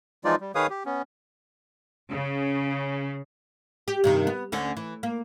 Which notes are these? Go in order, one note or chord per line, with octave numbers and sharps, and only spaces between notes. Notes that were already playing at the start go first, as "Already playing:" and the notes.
E3 F3 G#3 D#4 F4 D5
G3
D#3 G#4 B4 C#5 F5 D#6
G4
B3 C#4
C#3
G4
G2 C3 D#3
B3
D2 D3 C#4
E3
A#3